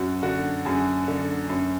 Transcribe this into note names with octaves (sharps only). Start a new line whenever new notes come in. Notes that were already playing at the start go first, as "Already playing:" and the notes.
Already playing: F#2 F#4
D3 F#4
F#2 G#4
D3
F#2